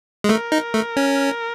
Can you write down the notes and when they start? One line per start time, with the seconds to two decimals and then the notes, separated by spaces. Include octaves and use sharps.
0.24 G#3
0.29 A3 A#4
0.52 D#4
0.74 A3
0.97 C#4